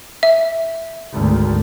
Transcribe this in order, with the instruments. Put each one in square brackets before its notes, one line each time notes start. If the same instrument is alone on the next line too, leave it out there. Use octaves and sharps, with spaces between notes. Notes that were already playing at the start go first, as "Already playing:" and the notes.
[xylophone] E5
[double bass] G#1 D2